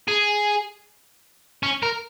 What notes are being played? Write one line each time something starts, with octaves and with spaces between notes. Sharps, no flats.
G#4
C#4
A#4